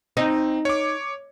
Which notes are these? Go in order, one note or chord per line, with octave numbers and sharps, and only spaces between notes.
C4 D#4
C#5 D6